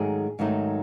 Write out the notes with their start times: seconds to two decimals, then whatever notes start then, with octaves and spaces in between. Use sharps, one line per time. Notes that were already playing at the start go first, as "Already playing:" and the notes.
Already playing: G#2 D#3 F#3 A3 D#4 G#4
0.39 G#2 D#3 F#3 A3 D#4